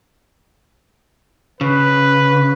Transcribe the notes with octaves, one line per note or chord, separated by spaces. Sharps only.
C#3 B4